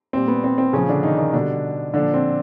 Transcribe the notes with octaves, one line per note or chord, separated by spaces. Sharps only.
A#2 G3 C4
B3
C4
C4
A#2 C#3 F3 C#4
D3 D4
D#3 D#4
D#3 D#4
B2 D3 G3 D4
A#2 D3 F3 D4
C4